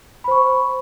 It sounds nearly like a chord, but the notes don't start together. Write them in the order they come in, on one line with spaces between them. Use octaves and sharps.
B5 C5 C#6